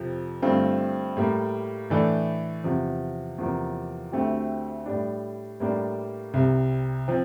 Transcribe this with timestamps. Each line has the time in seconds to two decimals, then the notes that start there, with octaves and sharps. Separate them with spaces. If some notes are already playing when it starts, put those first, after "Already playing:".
Already playing: F2 C3 F3
0.42 G2 D3 A3 C4 F4
1.17 A2 G3 A#3
1.90 A2 E3 A3 D4 A4
2.64 E2 C3 F3
3.38 E2 C3 F3 A#3
4.12 D2 D3 A3 C4 G4
4.86 A2 G3 D4
5.60 A2 G3 A#3 D4
6.34 C2 C3 G3
7.08 F3 C4